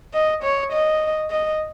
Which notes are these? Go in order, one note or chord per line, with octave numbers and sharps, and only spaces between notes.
D#5
C#5
D#5
D#5